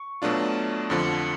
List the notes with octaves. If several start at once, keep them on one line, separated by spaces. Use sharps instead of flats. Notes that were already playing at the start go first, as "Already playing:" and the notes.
Already playing: C#6
B2 F#3 A3 D4 F4
F2 D3 F3